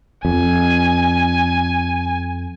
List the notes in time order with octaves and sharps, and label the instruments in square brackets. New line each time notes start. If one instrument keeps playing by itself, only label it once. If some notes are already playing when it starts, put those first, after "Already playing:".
[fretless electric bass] F2 [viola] G#5